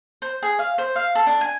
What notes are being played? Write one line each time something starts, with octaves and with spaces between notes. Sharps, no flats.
C5
G#4
F5
C5
F5
A4
D4
G#5